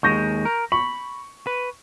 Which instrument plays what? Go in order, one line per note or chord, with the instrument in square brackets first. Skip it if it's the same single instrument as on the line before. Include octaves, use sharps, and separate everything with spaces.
[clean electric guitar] D#2 G#3 [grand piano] C#6 G6 A#6
[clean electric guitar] A#4
[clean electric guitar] B5 [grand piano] C#6
[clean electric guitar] B4